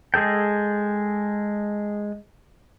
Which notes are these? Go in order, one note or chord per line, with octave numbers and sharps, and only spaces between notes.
G#3 G#4 A4 G5